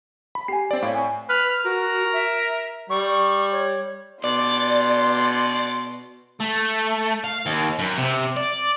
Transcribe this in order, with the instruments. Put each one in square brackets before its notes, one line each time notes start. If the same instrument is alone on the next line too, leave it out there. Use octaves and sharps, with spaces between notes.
[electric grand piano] B5
[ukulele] G4 G#5 [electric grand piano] C7
[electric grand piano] C4 D5
[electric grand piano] A2 [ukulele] C5 C#5 F5
[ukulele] G#5
[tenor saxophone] B4 [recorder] F6
[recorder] F#4 [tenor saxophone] A#4
[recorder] E5
[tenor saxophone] G3 [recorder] C#6
[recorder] C#5
[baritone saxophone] B2 [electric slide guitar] D5 [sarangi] C6
[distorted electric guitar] A3
F5
D#2
F#2
C3
D5